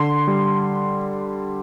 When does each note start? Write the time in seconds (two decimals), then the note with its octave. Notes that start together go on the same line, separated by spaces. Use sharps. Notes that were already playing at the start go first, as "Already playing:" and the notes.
Already playing: D3 C6
0.27 G3